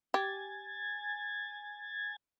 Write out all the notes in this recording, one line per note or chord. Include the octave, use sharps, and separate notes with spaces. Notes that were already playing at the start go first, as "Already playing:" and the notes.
G4 G#5 G#6 A6